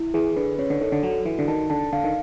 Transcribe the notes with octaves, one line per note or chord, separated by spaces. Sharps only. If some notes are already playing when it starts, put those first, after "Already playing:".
Already playing: E4
E3 G#4
D3 B4
C#3 C#5
D3
D#3 A4
D3
F#3 F#4
E3 F#4
D3
D#3 A5
D3 A5
D3 F5
D#3